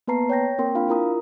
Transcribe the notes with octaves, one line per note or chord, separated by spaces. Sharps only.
A#3 B3 B4 A5 A#5 C7
C#5 G5 G6 A#6
A#3 C4 A#4 G5 C6
D4 F4 F5 B5
E4 F4 A#4 A#5 D#6